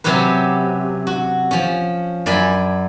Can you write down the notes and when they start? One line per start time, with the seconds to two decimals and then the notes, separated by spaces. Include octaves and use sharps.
0.04 C3 F#3 C#4 G4 B4
1.07 F#4
1.51 F3 C#4
2.26 F#2 D5 G#5 B5